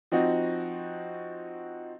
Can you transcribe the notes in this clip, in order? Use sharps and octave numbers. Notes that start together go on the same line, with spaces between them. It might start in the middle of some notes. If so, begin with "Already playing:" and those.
F3 C4 D#4 F#4 D#5